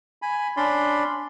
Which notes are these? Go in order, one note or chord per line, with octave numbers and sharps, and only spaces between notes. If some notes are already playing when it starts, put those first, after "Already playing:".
G#5 B5
C#4 D4 D5 B5 C6